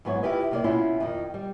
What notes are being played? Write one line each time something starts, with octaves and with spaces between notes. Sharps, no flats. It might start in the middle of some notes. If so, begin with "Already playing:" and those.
G#2 F#3 B3 E4 C#5
E4 F4 G4 B4 D#5
C3 A#3 D5
B2 C#4 E4 F4
F2 D#3
G3